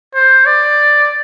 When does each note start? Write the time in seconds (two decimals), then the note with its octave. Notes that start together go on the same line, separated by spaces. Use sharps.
0.14 C5
0.46 D5